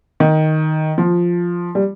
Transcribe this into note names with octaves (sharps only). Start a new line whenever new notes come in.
D#3
F3
G3